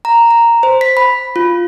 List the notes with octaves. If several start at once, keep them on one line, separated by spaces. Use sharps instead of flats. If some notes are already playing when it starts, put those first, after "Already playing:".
A#5
A#5
C5
B6
B5
F4